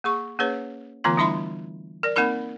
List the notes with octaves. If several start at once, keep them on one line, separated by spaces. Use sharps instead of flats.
A#3 G#4 C#6
A#3 C#4 G#4 B4 C#5
D3 E3 A3 B3 F4 A#5
G3 D4 E4 E5 B5 C6
A#4 D5
A#3 C4 D#4 A#4 B5